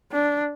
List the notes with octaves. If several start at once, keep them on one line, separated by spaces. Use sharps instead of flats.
D4